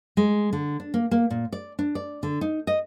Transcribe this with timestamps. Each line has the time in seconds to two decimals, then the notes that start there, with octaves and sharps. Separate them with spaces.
0.17 G#3
0.53 D3
0.80 D4
0.94 A#3
1.11 A#3
1.31 A#2
1.53 D5
1.79 D4
1.95 D5
2.23 D3
2.41 D#4
2.67 D#5